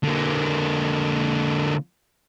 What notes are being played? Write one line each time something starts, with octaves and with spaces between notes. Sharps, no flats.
D3 A#3